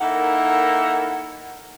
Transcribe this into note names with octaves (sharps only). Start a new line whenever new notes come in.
A#3 D#4 E4 A4 A#4 F#5